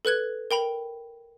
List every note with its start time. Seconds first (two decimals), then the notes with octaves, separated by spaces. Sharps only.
0.05 A4 B4 F#6 G#6
0.51 A#4 G5 B5 F7